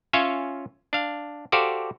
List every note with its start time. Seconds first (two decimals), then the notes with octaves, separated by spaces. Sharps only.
0.13 C#4 F4 C#5 E5 F5 G#5
0.93 D4 F5
1.52 F#4 G4 A4 C5 D5 F5